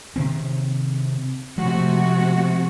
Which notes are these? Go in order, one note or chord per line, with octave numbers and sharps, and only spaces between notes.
C3 D#3 C4
C3 F3 G#3 A3 F#4